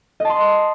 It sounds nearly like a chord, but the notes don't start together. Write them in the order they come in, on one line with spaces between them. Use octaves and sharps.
D#5 A5 C6